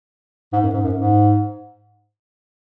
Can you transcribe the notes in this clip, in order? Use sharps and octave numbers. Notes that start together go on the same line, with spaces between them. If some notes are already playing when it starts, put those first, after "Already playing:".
G#2
F#2
G#2
F#2
G#2